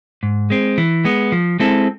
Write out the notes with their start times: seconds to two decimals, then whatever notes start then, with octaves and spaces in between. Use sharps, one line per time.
0.23 G#2
0.50 G#3 C4
0.78 E3
1.05 G#3 B3
1.32 F3
1.59 G#3 C4 E4 A4